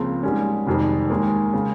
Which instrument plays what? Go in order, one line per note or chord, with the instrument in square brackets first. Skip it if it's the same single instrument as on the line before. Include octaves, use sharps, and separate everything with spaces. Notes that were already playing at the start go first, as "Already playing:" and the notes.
Already playing: [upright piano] C#2 C#3 F3 C4 F4 [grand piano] A#3
[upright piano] G#2 G3 C#4 [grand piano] G#3
[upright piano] F1 F2 D#3 G3
[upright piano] D#2 D#3 A#3 [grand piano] G#3
[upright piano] C#3